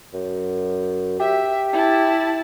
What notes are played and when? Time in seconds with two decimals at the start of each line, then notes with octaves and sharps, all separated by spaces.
0.14 F#2
1.20 G4 E5
1.72 E4 A5